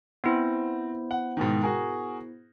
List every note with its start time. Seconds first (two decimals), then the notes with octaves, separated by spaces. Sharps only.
0.24 B3 C4 E4 C5
1.11 F#5
1.37 G#2 B2 D#3
1.62 F#4 G#4 A#4